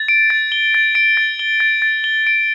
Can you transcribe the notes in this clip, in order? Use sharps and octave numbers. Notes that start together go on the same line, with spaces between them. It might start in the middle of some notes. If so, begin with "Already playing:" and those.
Already playing: A6
D7
A6
G7
A6
D7
A6
G7
A6
A6
G7
D7